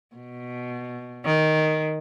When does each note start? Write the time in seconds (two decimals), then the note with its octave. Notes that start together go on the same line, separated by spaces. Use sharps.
0.16 B2
1.25 D#3